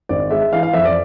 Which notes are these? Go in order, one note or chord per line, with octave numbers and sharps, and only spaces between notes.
G#1 D5
G#3 E5
E3 F5
F5
F2 E5
D5